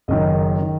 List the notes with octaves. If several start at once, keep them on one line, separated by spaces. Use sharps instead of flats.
F#1 F#2 D#3 D#5
D#3